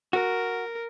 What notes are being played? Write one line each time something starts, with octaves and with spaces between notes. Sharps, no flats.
F#4 A#4